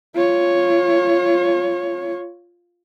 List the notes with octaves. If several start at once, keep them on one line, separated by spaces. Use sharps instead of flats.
F4 C#5